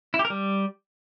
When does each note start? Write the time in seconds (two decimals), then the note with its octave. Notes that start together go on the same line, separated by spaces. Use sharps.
0.14 E4
0.19 G4
0.25 A#4
0.30 G3